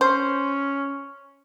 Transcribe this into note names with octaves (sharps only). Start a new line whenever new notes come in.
C#4 C5